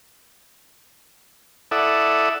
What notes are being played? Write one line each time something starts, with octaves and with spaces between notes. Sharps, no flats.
E4 A4 D5 E5 F#5 D#6